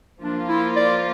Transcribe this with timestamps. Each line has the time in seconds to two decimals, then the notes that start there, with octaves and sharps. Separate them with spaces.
0.20 F3 A#3 D4 F4
0.48 E4
0.76 D5